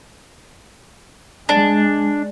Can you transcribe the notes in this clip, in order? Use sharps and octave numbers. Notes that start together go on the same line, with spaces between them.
G#3 D4